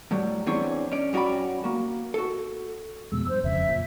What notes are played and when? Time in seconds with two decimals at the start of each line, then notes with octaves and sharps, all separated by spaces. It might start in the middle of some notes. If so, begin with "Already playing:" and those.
0.11 A2 F#3 G3
0.46 E2 E3 C4 D4 C#5
0.92 C#4 D5
1.13 F#2 C#4 F#4 D5 G5 B5
1.64 A#3 F#4
2.14 F#4 A4
3.12 F2 B2 G#3 E6
3.28 G2 C5
3.44 E1 F2 C#3 E5
3.68 F#1 A#2